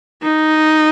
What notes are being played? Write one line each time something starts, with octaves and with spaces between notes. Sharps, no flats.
D#4